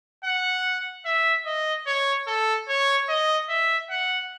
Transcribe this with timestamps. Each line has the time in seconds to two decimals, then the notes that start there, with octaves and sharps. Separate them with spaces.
0.25 F#5
1.05 E5
1.46 D#5
1.87 C#5
2.27 A4
2.69 C#5
3.09 D#5
3.49 E5
3.90 F#5